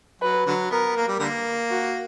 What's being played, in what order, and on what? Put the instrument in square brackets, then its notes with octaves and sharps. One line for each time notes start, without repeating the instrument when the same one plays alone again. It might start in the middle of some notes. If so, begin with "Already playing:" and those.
[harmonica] F#3 [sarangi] B4
[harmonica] D3 F#3
[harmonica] B3 [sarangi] A#4
[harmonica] A#3
G3
D3 G3 A#3
[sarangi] F#4